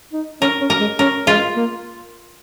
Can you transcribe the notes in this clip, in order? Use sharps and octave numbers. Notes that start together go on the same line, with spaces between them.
D#4
C#4 A#4
C#4
A#4
G#3
C#4 A#4
G#3 F4
A#3